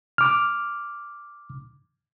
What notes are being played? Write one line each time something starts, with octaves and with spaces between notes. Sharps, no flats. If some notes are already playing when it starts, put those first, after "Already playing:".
D6 F6